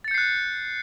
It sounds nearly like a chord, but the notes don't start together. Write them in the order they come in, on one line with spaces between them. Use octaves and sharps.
A6 C#7 G6 C7 F#6